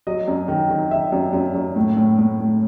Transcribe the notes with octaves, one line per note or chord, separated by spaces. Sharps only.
F#3 D#5
F#2
D#3
D#3
D#3 E5
F#2
F#2
F#2
A2
A2
A2
A2